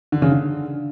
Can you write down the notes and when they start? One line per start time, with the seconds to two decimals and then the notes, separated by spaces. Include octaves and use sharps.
0.12 D3
0.22 C#3
0.32 D3